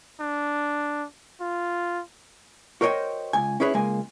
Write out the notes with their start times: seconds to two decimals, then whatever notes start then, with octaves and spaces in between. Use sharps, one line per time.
0.20 D4
1.41 F4
2.81 F#4 A#4 C5 C#5 D#5 G5
3.33 C#2 G#5
3.60 C#4 E4 G#4 B4 C#5
3.74 C#2 G#3 A#3 G#5